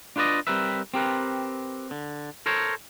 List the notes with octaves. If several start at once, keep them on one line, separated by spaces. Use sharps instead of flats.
D4 F4 B4 D5 D#5
G3 C4 A#4 B4 E5
C4 G4 A#4 B4
D3
A4 A#4 C5 C#5